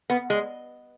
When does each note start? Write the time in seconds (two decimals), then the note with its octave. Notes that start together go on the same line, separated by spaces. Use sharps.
0.10 B3
0.30 G#3